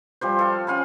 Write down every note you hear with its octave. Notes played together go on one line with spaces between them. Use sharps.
F3 G3 C5
A4 F5
C#4 F5 G#5 B5